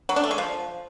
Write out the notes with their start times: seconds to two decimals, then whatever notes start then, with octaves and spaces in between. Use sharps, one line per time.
0.09 F#3
0.16 D4
0.24 A3
0.31 G#3
0.38 F3